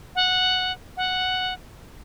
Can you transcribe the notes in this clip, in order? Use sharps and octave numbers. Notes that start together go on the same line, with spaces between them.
F#5
F#5